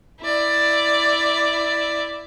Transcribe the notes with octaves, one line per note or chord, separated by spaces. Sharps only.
E4 D5